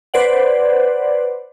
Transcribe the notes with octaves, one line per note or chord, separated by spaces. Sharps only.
B4 C5 D5 F#5